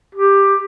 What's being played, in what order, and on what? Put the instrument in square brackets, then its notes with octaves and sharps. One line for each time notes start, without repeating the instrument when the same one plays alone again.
[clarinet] G4